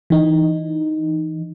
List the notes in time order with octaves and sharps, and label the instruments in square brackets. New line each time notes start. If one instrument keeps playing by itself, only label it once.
[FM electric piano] E3 D#4